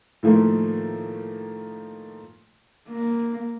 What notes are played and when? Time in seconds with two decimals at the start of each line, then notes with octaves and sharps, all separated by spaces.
0.23 A2 D#3 F3 A3 A#3
2.89 A#3